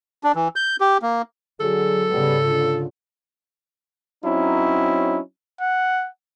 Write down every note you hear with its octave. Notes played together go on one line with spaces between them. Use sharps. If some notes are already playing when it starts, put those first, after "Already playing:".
D4
E3
G6
G4
A#3
D3 F#3 G#4 A4
G#2 C#3 G3 B3
D3 F4
F#3 C4 C#4 D#4 E4
F#5